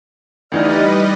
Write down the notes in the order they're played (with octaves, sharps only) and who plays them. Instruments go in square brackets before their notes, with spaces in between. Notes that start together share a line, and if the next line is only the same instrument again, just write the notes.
[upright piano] D2 E3 D#4 [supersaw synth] G3 B4 D#5 [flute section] D5 F6